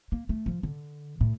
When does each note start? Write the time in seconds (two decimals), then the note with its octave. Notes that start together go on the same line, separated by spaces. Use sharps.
0.12 A#3
0.29 A3
0.46 F3
0.63 D3
1.21 A2